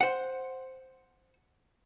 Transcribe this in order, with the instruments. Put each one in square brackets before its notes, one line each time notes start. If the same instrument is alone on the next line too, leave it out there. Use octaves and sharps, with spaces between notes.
[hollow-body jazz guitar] C5 F#5